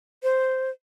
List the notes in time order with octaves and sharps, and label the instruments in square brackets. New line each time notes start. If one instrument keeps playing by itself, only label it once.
[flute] C5